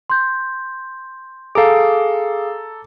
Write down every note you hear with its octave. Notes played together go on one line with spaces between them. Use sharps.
C6 G6
G#4 A4 F5 A#5 D6